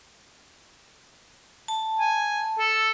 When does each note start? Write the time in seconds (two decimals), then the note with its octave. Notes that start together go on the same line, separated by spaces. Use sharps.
1.68 A5
1.99 G#5
2.59 A4